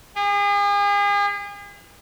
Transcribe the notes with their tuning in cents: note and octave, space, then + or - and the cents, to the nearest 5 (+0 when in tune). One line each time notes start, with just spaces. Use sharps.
G#4 -40